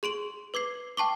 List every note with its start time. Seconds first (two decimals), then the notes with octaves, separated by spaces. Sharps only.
0.03 G#4 C6 D7 F#7
0.54 B4 D6 G#6 C7
0.97 G5 A5 C#6 D6